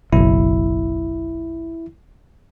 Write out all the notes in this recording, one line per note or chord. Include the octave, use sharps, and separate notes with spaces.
F#1 B1 E4